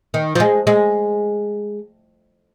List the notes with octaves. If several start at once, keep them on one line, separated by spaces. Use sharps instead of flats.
D#3
F3
G#3
G#3